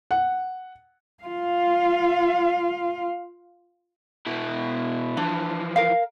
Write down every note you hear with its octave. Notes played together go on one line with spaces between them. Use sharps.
F#5
F4 F5
B2 E4
E3 F3 D4
A#4 F5